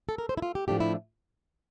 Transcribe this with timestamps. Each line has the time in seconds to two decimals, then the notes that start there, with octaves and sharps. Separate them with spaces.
0.09 A4
0.18 A#4
0.29 C5
0.37 E4
0.42 F4
0.55 G4
0.68 A2 F3 A3 D4 G4
0.80 E4